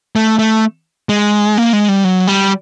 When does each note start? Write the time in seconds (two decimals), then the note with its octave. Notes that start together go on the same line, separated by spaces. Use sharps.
0.16 A3
0.39 A3
1.09 G#3
1.58 A#3
1.73 G#3
1.89 G3
2.04 F#3
2.27 G3